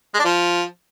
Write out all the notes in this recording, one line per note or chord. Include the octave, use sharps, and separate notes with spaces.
G#3
D4
F3